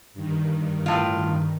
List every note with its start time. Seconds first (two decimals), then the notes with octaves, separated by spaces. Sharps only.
0.14 G2 D#3
0.86 A2 F4